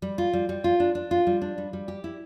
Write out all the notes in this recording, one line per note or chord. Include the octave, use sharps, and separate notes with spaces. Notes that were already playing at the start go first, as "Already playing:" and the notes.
G3
F4
G3
G3
F4
D4
D4
F4
G3
D4
G3
G3
G4
E4